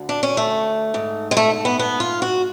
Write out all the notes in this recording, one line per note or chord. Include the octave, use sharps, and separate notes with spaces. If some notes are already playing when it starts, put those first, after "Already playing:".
Already playing: D2 D3
D4
C#4
A3
G#2
G#3
A3
B3
B3
F4
F#4